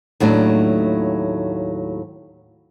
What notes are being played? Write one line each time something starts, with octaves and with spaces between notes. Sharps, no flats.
D#2 A2 F#3 A3 D4